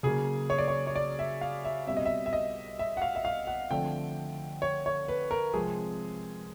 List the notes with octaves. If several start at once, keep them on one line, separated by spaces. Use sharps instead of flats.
C#3 F#3 A#3 G#4
C#5
D5
C#5
C#5
D5
E5
F5
E5
B2 G3 C4 E5
D#5
E5
E5
D#5
E5
F#5
F5
E5
F5
F#5
D3 F3 A3 C4 G5
C#5
C#5
B4
A#4
C3 F3 G#3 C4 G#4